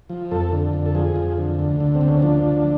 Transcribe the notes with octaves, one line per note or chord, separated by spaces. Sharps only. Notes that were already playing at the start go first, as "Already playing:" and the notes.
F3
F2 A4
D3
F2
A4
F3 G#4
F2
D3
D2
D3
C4
D2
C#4
F3 D4
D2